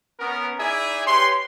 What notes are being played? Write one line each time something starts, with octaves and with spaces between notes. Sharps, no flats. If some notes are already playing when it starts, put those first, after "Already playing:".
B3 C#4 A#4
D#4 E4 G#4 D5 E5 G#5
G4 B4 C#5 C6